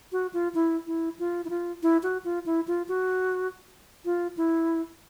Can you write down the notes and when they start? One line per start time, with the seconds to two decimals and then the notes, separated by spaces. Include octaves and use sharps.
0.12 F#4
0.33 F4
0.55 E4
0.87 E4
1.19 F4
1.45 E4
1.50 F4
1.83 E4
2.03 F#4
2.24 F4
2.46 E4
2.68 F4
2.88 F#4
4.05 F4
4.37 E4